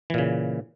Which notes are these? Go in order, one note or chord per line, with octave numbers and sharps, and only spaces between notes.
A#2 C#3 E3